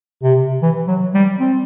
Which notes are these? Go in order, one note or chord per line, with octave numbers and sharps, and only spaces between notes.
C3
E3
F#3
G3
C4